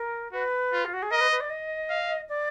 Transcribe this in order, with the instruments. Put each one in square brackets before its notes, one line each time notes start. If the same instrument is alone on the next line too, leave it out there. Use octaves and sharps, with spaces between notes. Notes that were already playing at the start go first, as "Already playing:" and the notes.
Already playing: [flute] A#4
[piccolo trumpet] F#4 [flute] B4
[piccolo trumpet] F4
[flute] F4
F#4
G#4
[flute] A#4 [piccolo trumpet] D#5
[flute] B4
B4
D5
D#5
[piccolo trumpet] F5
[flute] D5